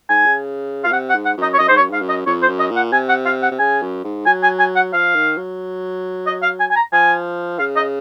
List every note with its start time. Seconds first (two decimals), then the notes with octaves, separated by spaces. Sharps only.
0.09 G#2 G#5
0.26 C#3
0.84 A#2 F5
0.92 C3 F#5
1.10 F#5
1.15 G#2
1.26 F#5
1.37 F#2 D#5
1.54 C#5
1.59 F#2 D#5
1.68 G#2 C5
1.77 C#5
1.80 F#2
1.90 G#2 F5
2.01 F#2
2.09 D#5
2.26 F2 C#5
2.42 C5
2.48 F#2
2.60 D#5
2.70 A#2
2.76 F#5
2.92 C3 G#5
3.09 F#5
3.26 F5
3.43 F#5
3.51 C3
3.59 C#3 G#5
3.82 F#2
4.04 G#2
4.26 F#3 G#5
4.43 G#5
4.59 G#5
4.76 F#5
4.93 F3 F5
5.15 D#3
5.37 F#3
6.27 D#5
6.43 F5
6.60 G#5
6.71 G#5
6.76 A#5
6.93 F3 G#5
7.59 C#3 F5
7.76 D#5